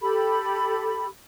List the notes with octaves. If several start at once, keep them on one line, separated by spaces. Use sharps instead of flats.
G4 A4 B5